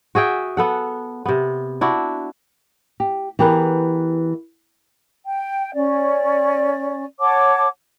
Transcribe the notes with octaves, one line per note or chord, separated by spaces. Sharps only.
F#4 G#4 E5 G5
B3 A4 F#5
C3 B3
D4 E4 F#4
G4
E3 B3 G4 G#4 A#4 B4
G5
C#4 D5
C#5 F#5 A5 D6